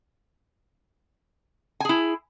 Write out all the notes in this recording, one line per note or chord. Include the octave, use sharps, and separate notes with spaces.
E4 G#4 G#5